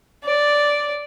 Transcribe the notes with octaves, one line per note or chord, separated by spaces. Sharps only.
D5